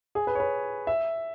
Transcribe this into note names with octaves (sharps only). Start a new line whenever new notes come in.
G#4
B4
C#5
B4
E5